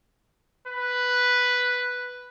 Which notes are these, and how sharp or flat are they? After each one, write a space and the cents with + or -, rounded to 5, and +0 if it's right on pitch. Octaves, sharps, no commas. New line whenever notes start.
B4 +0